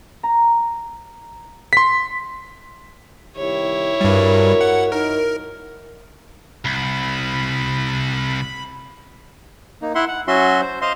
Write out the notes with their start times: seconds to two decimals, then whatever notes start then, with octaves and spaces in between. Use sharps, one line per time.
0.23 A#5
1.73 C6 B6
3.36 C2 D#3 E4 G4 C#5
4.01 G2 G3 F#4 A#4
4.61 F#5
4.92 D#4 A#4
6.65 C2 B5
9.82 A#3 D#4
9.95 E4 E5 F#5 C6
10.08 F#5
10.28 F#3 C#4 F#4 E5 C6
10.61 C5
10.82 C5 D#5 F5 C6